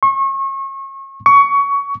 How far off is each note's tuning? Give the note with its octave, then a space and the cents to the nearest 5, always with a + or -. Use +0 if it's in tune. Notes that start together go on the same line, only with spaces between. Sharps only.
C#6 -35
C#6 +20